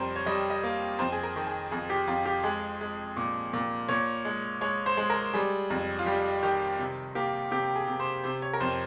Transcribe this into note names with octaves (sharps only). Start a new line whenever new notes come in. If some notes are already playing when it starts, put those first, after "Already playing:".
Already playing: F2 G3 A#4 C5
C#5
G3 D#5
D#5
A#3
F2 C5
G#4
A#4
D#3
G#4
F2 G#4
G4
F2 F4
G4
G#3 G#4
G#3
A#2
A#2
A#2 C#5
G#3
G#3 C#5
C5
G#3
A#4
G3 G#4
F2
F4
G3 G4
D#3 G4
C3
A#3 G4
C3 G4
G#4
C3
C5
C3 C5
C#5
A#4
F2 C5